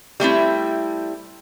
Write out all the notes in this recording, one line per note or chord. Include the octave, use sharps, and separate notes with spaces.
G3 A3 C4 E4